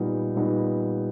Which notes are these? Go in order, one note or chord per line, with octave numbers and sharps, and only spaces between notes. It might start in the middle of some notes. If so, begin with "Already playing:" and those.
Already playing: A#2 G3 B3 D#4
A#2 G3 B3 D#4